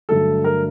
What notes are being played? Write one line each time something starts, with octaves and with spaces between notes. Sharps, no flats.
G2 D3 F#3 A3 A4
A#4